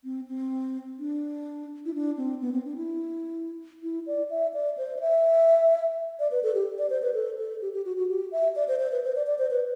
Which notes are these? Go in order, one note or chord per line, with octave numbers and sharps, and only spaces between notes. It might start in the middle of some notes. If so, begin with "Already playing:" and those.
C4
C4
D4
E4
D4
C4
B3
C4
D4
E4
E4
D5
E5
D5
C5
D5
E5
D5
B4
A4
G4
D5
C5
B4
A4
A4
G4
G4
F#4
F#4
G4
E5
D5
C5
C5
B4
C5
D5
D5
C5
B4